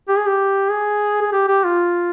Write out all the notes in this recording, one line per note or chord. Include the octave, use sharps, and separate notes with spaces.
G4
G#4
G4
G#4
G#4
G4
G4
F4